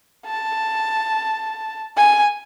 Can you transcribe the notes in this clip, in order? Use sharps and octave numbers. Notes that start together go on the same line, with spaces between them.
A5
G#5